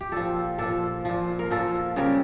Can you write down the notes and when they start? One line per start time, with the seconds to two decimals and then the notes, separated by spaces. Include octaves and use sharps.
0.01 G4
0.12 A#2 F3 A4
0.58 A#2 F3 A4
1.05 A#2 F3
1.39 A#4
1.51 A#2 F3 A4
1.96 C#3 G3 A#4